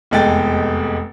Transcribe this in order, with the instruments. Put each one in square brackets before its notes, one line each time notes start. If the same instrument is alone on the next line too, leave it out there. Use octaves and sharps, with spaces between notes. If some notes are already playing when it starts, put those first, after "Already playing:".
[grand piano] F1 E2 G#3 A4 G5 A6